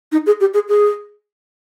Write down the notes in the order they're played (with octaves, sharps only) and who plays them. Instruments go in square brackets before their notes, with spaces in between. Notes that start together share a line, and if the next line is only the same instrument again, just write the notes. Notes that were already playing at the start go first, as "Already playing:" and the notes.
[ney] D#4
G#4
G4
G#4
G#4